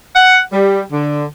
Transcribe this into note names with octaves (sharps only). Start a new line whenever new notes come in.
F#5
G3
D3